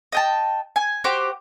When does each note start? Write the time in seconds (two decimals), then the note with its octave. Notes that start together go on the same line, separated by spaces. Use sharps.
0.12 D#5 G5 A5
0.76 G#5
1.04 F#4 G4 C5 D6